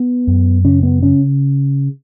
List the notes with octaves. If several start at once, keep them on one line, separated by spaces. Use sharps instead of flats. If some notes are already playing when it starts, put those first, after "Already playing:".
Already playing: B3
F#2
C#3 C#4
B3
C#3 C#4